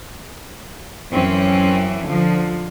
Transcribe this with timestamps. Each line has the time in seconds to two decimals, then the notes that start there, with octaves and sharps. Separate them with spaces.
1.09 F#2 E3 C4 C#4
2.05 D3 F3